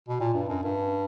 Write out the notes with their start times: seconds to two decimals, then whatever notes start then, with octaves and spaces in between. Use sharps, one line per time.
0.09 B2
0.20 A#2
0.34 G2
0.49 F#2
0.63 G2